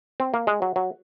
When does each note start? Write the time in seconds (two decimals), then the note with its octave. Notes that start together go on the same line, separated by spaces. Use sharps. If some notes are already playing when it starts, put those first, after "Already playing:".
0.20 C4
0.34 A#3
0.47 G#3
0.62 F#3
0.76 F#3